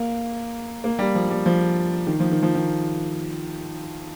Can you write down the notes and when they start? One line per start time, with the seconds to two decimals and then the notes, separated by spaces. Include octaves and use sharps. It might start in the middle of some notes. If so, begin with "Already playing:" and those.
Already playing: A#3
0.84 A#3
0.99 G3
1.15 F3
1.30 G3
1.46 F3
2.07 D#3
2.20 F3
2.31 D#3
2.42 F3
2.55 D#3